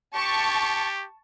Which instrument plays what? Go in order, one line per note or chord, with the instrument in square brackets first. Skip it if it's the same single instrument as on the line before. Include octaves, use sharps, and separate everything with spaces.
[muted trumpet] G4 [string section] A5 C#6